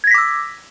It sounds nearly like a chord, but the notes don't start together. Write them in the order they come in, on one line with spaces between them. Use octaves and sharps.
G#6 A#6 B6 D6 E6